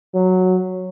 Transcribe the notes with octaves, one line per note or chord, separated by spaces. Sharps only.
F#3